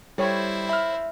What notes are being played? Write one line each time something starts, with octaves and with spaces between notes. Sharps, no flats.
G3 E4 A4 C5 C#5 G5
E5 B5 F6